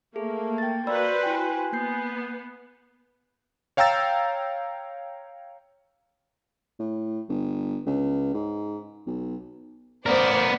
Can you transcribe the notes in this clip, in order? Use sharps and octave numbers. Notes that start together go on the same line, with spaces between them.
A3 A#3 G#4
G5 A6
A#3 F#4 B4 C5 D5 B5 E6
E4 G5 G#5
A#3 B3 G6 C7
C#5 F5 G5 A#5 E6 A6
A2
G1
C#2
G#2
B1
B3 A#4 C5 D5